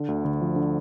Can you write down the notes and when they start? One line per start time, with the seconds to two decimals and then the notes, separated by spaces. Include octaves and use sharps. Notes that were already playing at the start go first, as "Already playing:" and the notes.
Already playing: D3
0.08 D2
0.25 D2
0.41 F3
0.56 D3